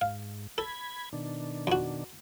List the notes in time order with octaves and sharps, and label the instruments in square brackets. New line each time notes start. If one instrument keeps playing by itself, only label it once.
[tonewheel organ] G#2 [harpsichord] F5
[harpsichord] A4 [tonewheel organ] B5 G#6
[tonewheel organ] B2 D#3 D4
[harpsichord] F2 F#4